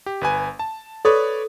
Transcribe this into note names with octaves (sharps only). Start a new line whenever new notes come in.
G4
G1 B4 G#5
A5
A4 B4 C#5 D5